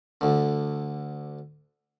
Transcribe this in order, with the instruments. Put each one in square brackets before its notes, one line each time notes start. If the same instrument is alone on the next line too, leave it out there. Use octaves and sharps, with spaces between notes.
[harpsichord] D2 D3